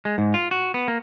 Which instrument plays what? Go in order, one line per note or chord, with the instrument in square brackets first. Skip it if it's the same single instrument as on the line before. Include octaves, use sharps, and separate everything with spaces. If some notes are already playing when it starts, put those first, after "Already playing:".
[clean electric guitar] G#3
G#2
F4
F#4
B3
A#3